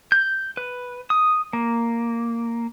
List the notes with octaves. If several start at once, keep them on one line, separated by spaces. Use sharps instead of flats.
G6
B4
D#6
A#3